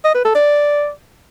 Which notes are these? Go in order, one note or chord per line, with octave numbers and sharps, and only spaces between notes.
D#5
B4
A4
D5